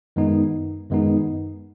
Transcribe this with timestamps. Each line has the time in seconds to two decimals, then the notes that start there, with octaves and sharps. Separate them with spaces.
0.16 F#2 D#3 G#3 B3 D#4
0.90 F#2 D#3 G#3 B3 D#4